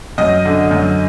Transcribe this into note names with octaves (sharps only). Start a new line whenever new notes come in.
F#2 D#5
D3
F#2